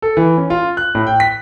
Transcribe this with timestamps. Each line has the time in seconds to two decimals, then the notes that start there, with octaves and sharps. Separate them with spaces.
0.02 A4
0.17 E3
0.38 C#4
0.50 F4
0.77 F#6
0.95 A2
1.07 G5
1.20 B6